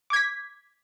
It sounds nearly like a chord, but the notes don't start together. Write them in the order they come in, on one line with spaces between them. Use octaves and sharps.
D6 G#6 B6